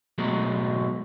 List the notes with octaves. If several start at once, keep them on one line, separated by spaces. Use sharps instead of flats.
B2 F#3 G#3 A3